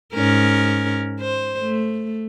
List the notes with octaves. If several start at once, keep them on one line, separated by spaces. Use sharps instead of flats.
G#2 C#4 A#4
C5
A3